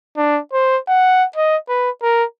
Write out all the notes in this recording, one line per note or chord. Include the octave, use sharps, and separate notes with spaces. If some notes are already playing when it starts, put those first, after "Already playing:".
D4
C5
F#5
D#5
B4
A#4